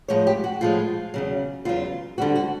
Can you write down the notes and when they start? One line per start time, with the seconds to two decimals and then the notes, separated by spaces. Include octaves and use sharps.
0.08 A2 F3 G#3 C#5
0.27 G4
0.44 F#4
0.61 A2 F3 G#3 F4
1.14 E2 C#3 F#3
1.65 E2 C#3 F#3 F4
2.18 D3 G3 C4 F#4
2.36 F#4